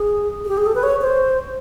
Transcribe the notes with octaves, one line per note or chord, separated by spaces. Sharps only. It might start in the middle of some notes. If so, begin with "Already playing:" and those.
Already playing: G#4
G#4
G4
G#4
A4
B4
C#5
C5